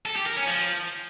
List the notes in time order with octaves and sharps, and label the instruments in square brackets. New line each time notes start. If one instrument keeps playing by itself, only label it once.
[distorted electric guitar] A4
G4
A#4
C#4
F3